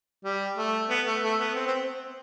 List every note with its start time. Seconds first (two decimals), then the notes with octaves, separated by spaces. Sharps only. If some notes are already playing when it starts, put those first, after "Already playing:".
0.25 G3
0.57 A3
0.89 B3
1.06 A3
1.23 A3
1.40 B3
1.55 C4
1.67 C4